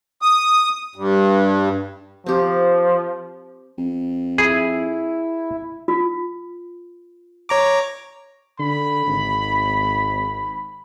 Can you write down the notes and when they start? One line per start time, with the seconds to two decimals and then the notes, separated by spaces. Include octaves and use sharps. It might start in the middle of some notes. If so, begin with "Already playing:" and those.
0.22 D#6
0.96 G2
2.26 F3 C4 G4
3.78 F2
4.38 E4 G#4
5.88 F4
7.49 C#5 A#5 D6
8.59 D3 B5
9.06 G#1